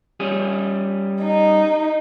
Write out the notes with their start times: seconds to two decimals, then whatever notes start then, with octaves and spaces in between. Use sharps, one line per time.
0.20 G3 C#4 G#4
1.23 D#4